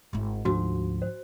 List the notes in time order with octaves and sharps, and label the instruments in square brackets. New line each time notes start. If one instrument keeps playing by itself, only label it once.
[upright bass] G#1 E4
[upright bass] D2 D3 [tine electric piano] G#2 F3 [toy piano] F#4
[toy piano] C5